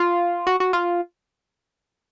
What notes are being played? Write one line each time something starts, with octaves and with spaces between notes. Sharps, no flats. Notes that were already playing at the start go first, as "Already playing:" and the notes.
Already playing: F4
F#4
F#4
F4